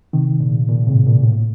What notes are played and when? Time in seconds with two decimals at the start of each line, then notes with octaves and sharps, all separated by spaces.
0.13 C3 D#3
0.40 A#2
0.69 A#2
0.87 A2 C3
1.06 A#2
1.24 A2